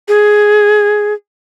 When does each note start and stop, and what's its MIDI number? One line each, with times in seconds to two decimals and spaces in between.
0.08 1.14 68